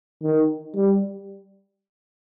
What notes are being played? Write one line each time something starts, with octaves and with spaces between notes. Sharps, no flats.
D#3
G3